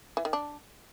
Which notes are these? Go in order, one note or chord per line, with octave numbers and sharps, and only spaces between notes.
E3
D#3
D4